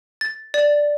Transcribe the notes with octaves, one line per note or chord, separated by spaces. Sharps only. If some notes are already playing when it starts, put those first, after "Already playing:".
A6
D5